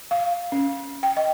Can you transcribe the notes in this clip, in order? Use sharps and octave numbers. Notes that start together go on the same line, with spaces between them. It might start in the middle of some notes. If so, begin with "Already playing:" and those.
F5
C#4
G5
D#5